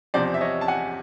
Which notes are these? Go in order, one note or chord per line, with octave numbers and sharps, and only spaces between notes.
E2 C3 F3 C5 D5
E5
C#5 D#5
A5
F#5 G#5